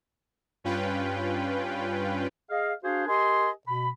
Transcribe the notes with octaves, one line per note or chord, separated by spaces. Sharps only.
G2 C#4 F4 B4 G5
G#4 D#5 F5
D4 F#4 G#4 C5 F5
G4 A#4 D#5 G#5 C6
B2 B5